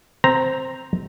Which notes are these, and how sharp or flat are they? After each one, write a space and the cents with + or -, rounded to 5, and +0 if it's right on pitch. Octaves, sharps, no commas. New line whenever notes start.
C4 +0 C5 +0 A#5 +0